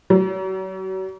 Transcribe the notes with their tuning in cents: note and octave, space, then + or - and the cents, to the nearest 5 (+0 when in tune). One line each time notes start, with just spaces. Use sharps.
F#3 +40